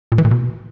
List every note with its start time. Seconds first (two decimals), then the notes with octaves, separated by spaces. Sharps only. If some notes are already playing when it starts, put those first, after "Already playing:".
0.12 A#2
0.18 E3
0.25 A#2
0.31 B2